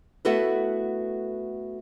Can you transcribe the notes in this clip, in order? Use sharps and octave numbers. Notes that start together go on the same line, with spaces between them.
A3 B3 E4 F#4 A4 B4